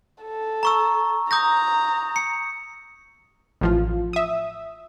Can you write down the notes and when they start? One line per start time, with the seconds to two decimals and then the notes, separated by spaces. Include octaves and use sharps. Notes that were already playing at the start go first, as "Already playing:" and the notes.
0.23 A4
0.63 A#5 C#6 E6
1.31 A#5 D#6 G6 A#6
2.16 C#7
3.61 A1 F3 F4
4.13 E5 D#6